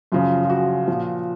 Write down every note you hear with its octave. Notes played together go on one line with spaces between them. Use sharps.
F#2 C#3 F3 F4
F4
F#4
A#2 F3